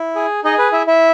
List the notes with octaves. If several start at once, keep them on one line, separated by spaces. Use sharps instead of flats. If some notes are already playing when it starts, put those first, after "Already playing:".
Already playing: E4
G#4
D#4 G#4 D#5
B4
E4 E5
E4 E5